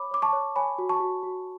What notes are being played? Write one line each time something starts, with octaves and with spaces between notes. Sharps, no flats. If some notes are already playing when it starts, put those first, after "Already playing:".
Already playing: C#5 B5 D6
C#5 D6
A5 C#6
C#5
C#5 G#5 B5
F#4
A5 C#6
F#4
F#4